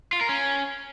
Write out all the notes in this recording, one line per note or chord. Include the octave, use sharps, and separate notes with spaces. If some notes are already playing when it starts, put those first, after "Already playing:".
F4
A#4
C#4